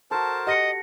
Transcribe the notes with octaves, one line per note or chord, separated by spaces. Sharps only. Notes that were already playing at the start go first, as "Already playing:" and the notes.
F#4 A4 A#4 C5 A5
G4 D#5 F#5 A#6 C#7